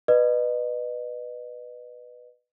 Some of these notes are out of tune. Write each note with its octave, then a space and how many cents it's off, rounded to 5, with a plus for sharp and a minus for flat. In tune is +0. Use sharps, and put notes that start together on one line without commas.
B4 -5 D#5 -35